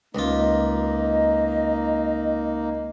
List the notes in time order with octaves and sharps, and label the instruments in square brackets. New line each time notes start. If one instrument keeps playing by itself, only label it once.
[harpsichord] C#2 F4 [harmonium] A#3 D#4 [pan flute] D#5